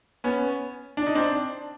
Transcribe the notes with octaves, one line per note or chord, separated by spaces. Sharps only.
B3 C#4
D4
D#4
C4 D4